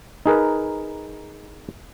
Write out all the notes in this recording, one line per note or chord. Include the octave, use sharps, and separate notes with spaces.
D#4 G#4 A#4 B4